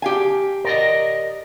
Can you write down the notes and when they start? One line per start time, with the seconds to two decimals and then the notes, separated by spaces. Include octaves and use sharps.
0.02 G4 F5 G#5
0.64 A#4 D5 D#5